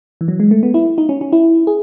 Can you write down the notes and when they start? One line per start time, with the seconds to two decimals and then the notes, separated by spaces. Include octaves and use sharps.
0.21 E3
0.28 F#3
0.40 G#3
0.51 A3
0.63 B3
0.74 E4
0.98 D#4
1.09 C#4
1.21 C#4
1.33 E4
1.67 G#4